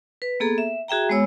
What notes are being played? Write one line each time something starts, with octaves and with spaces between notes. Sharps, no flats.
B4
A#3 B3 G#4 A4 A#5
E5
F#4 G#4 E5 G5 A#5
G#3 B3 C#5 E6